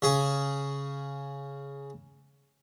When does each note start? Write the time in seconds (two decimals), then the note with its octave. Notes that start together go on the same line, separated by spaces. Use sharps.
0.02 C#3 G#4